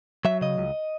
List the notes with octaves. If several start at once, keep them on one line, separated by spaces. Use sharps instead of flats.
F#3 E5
C#3 D#5
C#2